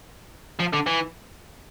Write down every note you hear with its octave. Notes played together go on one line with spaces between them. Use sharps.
F3
D3
E3